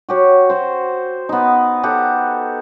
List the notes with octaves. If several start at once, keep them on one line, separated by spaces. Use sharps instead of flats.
F#4 G4 C#5
F#4 C5
B3 D#4
G4 A4 F#5